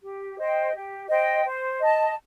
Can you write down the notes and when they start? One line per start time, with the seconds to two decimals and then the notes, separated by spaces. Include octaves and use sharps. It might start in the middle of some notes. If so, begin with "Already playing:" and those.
0.03 G4
0.38 C5 D#5 G5
0.74 G4
1.08 C5 D#5 G5
1.45 C5
1.79 D#5 A5